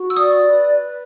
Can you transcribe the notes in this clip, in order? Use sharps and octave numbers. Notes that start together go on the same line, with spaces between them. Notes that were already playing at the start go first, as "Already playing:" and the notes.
Already playing: F#4
E6
D5 D#6
B4